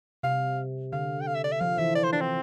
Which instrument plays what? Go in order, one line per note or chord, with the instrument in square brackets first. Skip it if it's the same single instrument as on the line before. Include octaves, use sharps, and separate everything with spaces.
[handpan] C3 [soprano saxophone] F5
[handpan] D3 [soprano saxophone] F5
[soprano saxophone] G5
F5
E5
D5
E5
[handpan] F3 [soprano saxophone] F5
[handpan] E3 [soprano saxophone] E5
[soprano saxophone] D5
C5
D4
C4